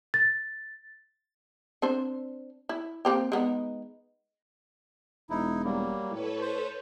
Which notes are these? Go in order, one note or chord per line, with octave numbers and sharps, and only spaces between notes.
A6
C4 D4 C5
E4
A#3 C4 G4
G#3 B3 D#4
E1 D#4 E4
F#3 G3 A#3
A2 A4 B4 C#5
C5